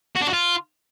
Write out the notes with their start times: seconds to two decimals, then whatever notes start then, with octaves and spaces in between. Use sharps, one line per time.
0.16 F#4
0.22 D4
0.27 F#4
0.33 F4